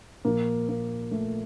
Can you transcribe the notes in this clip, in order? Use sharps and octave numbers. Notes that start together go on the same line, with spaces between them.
A#2 F3 A#3
A#3
A3